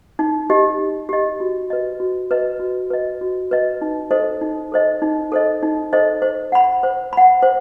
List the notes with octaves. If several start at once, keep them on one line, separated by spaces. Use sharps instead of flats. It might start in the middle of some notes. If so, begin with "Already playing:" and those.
D#4
G4 D#5
D#4
G4 D#5
F#4
B4 D#5
F#4
B4 D#5
F#4
B4 D#5
F#4
B4 D#5
D#4
A4 C5 D#5
D#4
A4 C5 D#5
D#4
A4 C5 D#5
D#4
A4 C5 D#5
C5
F#5 B5
C5
F#5 B5
C5